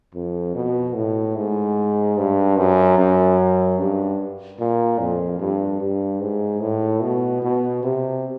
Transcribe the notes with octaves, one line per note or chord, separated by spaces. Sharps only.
F2
B2
A2
G#2
G2
F#2
F#2
G2
A#2
F2
G2
G2
G#2
A2
B2
B2
C3